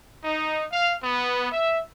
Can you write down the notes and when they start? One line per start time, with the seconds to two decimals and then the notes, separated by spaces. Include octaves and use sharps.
0.24 D#4
0.72 F5
1.03 B3
1.52 E5